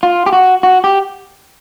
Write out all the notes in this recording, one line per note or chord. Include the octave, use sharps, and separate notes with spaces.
F4
G4
F#4
F#4
G4